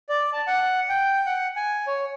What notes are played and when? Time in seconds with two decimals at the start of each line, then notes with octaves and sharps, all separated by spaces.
0.09 D5
0.33 A5
0.47 F#5
0.89 G5
1.26 F#5
1.56 G#5
1.87 C#5